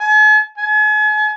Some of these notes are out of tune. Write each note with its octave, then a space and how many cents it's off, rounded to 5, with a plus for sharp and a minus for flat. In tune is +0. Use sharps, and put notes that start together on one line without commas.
G#5 +45
G#5 +40